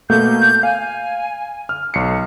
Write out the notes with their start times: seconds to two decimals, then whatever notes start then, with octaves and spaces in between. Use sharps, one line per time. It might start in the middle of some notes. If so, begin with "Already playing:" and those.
0.10 B2 A3 A#3 G6
0.63 F5 G#5
1.69 F6
1.94 B1 C7 C#7